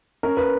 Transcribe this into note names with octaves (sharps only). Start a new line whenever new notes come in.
C#4 A#4
B4